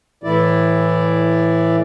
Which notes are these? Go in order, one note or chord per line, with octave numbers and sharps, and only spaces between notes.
A2 E3 E4 D5